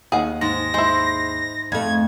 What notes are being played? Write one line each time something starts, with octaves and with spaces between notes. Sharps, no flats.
D#2 G#4 F#5
G#2 A#6
G#3 E4 C5
F2 A3 G#6